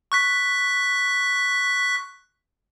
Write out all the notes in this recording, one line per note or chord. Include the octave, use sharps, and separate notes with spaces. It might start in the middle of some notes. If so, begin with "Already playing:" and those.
C#6 F#6 B6